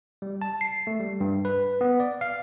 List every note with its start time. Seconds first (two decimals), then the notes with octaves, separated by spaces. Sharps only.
0.22 G3
0.42 A5
0.61 C7
0.87 A3
1.00 G3
1.20 G2
1.45 B4
1.81 B3
2.00 D5
2.21 F5